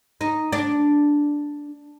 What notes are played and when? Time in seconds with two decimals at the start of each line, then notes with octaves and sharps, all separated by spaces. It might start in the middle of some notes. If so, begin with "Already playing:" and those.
0.21 D#4
0.53 D4